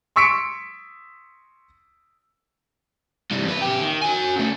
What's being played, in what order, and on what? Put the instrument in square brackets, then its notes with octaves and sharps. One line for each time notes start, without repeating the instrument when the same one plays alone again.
[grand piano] C6 C#6 E6 B6 C#7 D7
[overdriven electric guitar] G2 C3
F2 B4
C#3 G4
D#3
F#4 G#5
C#3 A3